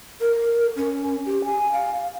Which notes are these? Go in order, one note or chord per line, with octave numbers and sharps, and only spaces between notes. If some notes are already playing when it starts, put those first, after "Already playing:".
A#4
C#4
G4
G#5
F5